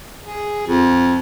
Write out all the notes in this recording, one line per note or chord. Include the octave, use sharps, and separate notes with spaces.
G#4
F2